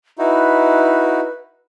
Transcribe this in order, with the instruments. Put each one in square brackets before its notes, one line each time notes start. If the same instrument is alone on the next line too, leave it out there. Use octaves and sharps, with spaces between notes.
[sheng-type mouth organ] D#4 E4 F#4 [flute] B4